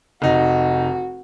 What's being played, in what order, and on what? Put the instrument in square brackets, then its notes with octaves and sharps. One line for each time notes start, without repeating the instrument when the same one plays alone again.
[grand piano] F1 D#4 [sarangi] F#4